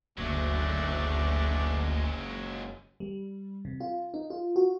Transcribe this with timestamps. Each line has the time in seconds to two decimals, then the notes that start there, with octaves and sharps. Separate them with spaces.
0.18 F#1 D2 F#3 G#3 A3 D4
3.00 G3
3.65 C3
3.80 F4
4.14 D#4
4.30 F4
4.56 F#4